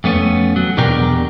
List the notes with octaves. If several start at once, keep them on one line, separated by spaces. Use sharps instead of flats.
F2 A3 B3 C#4
F#3
E2 B2 D4 G4 A#4